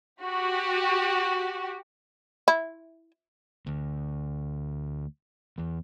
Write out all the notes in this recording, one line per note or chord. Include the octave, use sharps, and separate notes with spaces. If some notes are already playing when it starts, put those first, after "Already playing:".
F#4 G4
E4
D2
E2